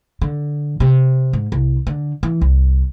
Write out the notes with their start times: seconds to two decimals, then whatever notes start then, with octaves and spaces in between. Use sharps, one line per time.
0.22 D3
0.80 C3
1.33 G#2
1.52 C2
1.87 D3
2.23 E3
2.41 C2